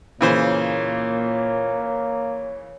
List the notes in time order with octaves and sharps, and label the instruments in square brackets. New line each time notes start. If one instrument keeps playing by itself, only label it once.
[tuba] A#2 [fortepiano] C#3 E3 C5 [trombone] A#3 [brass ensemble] C#5